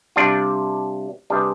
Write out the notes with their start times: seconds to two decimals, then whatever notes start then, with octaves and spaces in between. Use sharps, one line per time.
0.16 C3 G3 D4 F4
1.30 C3 G3 D4 G#4 B4